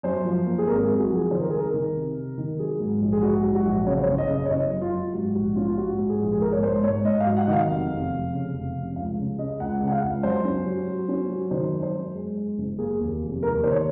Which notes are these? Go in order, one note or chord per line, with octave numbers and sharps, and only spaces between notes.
F#2 C5
F3
A#3
G#4
G#1 A#4
G#4
F#2
F#4
F3
G#4
D#3 C5
A#4
C2 G#4
A#4
D#3
C3
C3
D#3
F#3 G#4
G#2
A#1
G#4
G#2 F#4
F#3
F#4
A#1
C#3 C#5
C5
C#5
F#1
D#5
C#3
D#5
C#5
F#1 D#5
F#2
F4
F#2
G#2 F#4
A#1 F#4
C#4 F4
F4
G#2 F#4
G#2
G#4
A#1
G#4
G#2 A#4
C#5
G#2 C5
G#2 C#5
G#2 D#5
F5
F#3
F#5
D#3 D#5
F5
F1
F1
F1
C#3
F1
F1
C#2 F5
C#3
C#3 D#5
C#2 F#5
C#3
F#5
F5
C#2
F#2 C5
C#4
F#3
F#3
C#4
F#3
D#3 C5
F#2
C5
F#2
G#3
G#3
F#1
A#3 G#4
D#2
F1
D#2 A#4
D#3 C5
C#5